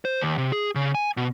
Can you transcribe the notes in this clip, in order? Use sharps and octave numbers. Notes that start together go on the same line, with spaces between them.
C5
D#2
C3
G#4
C#3
G#5
B2